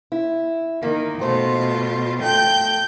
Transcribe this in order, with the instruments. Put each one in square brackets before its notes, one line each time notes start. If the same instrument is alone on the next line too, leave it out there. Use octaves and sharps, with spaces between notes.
[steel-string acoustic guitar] E4
[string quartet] D#3 [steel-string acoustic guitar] A#3
[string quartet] B2 F4 [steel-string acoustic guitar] A3 C5
[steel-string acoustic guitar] A3 A4 [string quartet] G5 G6